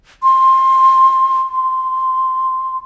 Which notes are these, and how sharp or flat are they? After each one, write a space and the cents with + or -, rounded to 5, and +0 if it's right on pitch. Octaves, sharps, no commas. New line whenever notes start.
C6 +20
C6 -5